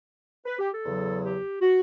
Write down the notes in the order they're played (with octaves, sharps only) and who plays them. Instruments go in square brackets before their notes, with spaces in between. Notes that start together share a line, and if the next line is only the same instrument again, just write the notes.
[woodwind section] B4
G4
A4
E2 C#3 F#3
G4
F#4